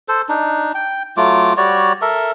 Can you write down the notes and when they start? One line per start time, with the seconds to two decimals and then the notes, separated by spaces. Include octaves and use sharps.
0.08 A4 C5
0.29 D4 D#4
0.75 G5
1.17 F#3 A3 F4 D6
1.57 G3 F#4 C#5 D5
2.02 A4 A#4 E5